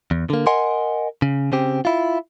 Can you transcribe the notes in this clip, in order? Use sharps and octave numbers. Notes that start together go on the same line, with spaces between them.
E2
D3 A#3
A#4 D#5 F#5 G#5 C6
C#3
C#3 C4 G4
E4 F4